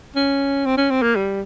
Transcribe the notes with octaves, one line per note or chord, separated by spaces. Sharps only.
C#4
C4
C#4
C4
A#3
G3